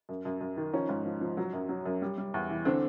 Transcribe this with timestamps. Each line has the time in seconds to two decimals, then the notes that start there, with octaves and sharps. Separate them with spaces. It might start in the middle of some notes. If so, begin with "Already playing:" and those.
0.09 F#2
0.25 F#2
0.41 F#2
0.57 D#3
0.73 F3 C#4 D#4
0.89 G#2
1.05 F3
1.21 F3
1.37 F#3
1.53 F#2
1.69 F#3
1.86 F#2
2.02 G3
2.18 G3
2.34 E2
2.49 E3
2.65 D3 C4 D4